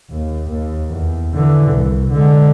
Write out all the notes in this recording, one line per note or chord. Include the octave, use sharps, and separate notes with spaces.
D#2
D#2
E2
D3 E3
C2
D3 G#3